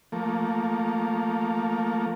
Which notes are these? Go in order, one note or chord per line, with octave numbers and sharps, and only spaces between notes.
F3 A3 A#3